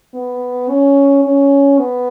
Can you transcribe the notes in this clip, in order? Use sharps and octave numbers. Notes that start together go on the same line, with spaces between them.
B3
C#4
C#4
B3